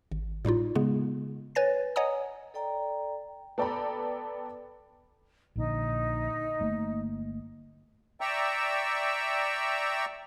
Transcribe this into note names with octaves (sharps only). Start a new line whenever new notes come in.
G#1
A2 G3 D#4 F4
C#3 G#3 B3
B4 C#5 G#5 A6 A#6
C#5 D#5 F#5 G#5 A#5 D#6
A4 D5 G5 A#5
B3 A4 D5 G5 A#5 B5
A#1 A#2 D3 D#4
G1 A3 A#3
D5 E5 G5 A#5 C#6 E6